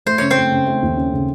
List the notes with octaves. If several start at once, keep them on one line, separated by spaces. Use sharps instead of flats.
A3 C5
C#3 C#5
C4 C5
A3
C#3
A3
D#2
C#4
C#3